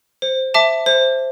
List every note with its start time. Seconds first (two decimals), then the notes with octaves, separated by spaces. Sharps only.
0.22 C5
0.54 E5 A5 D6
0.86 C5